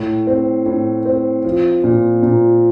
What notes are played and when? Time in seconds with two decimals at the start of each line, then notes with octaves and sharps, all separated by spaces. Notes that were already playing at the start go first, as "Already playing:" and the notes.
Already playing: A2
0.27 C4
0.66 A2
1.06 C4
1.45 F3
1.84 A#2
2.23 A#2